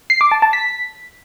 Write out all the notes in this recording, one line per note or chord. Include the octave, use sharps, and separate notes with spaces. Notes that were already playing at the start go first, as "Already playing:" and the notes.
C7
D6
A5
A5
B6